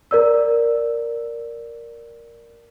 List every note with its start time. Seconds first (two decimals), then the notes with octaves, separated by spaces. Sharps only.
0.11 A#4 D5 E6